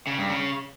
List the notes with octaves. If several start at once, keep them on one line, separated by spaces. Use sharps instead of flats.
C#3
G2
C#3